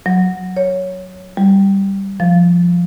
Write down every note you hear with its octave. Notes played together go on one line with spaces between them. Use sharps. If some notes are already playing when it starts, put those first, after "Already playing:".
F#3
C#5
G3
F3